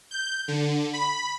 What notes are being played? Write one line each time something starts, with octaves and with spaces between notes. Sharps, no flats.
G6
D3
B5